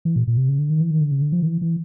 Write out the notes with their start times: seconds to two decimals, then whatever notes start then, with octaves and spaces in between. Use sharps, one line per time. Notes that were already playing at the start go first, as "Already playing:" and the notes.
0.05 E3
0.16 A#2
0.27 A#2
0.37 C3
0.48 C#3
0.59 D3
0.70 D#3
0.81 E3
0.91 D#3
1.01 D3
1.12 C#3
1.22 D3
1.32 F3
1.43 D#3
1.46 E3
1.61 E3